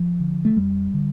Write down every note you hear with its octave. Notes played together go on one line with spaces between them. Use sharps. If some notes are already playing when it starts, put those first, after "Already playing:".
Already playing: F3
D3
A3
F2 G3
D3